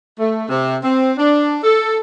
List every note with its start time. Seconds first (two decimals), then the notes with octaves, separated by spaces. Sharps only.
0.19 A3
0.49 C3
0.83 C4
1.18 D4
1.64 A4